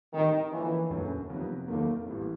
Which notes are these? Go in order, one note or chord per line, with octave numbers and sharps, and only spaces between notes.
A2 D#3 E3 G3 C4
D3 E3 F3 A#3 C#4
F#1 F#2 D3 F#3 A3
F2 C3 D#3 F#3 B3
F1 D#2 D#3 F#3 A3 A#3
A1 A2 E3 G3